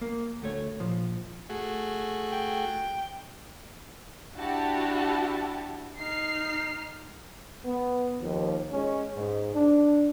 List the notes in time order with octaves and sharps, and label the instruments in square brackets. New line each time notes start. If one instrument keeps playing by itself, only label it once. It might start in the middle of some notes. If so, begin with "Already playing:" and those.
[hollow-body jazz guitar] A#3
D2 A3 C#5
A#2 F3
[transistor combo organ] A3 F#4 G#4
[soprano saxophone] G5
[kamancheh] D4 E4 [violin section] F#4 G4 A5
[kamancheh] D#4 F6 [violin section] C7
[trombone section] B3
D#2 F3
G#3 C#4
G#2
D4